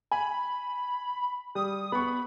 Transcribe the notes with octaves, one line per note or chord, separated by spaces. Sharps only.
G#5 B5
G3 D#6
B3 B5 C#6